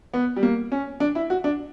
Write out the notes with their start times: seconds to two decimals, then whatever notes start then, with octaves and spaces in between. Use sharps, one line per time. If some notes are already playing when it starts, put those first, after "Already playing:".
0.14 B3
0.36 G3
0.43 A#3
0.72 C#4
1.00 D4
1.15 E4
1.30 F#4
1.44 D4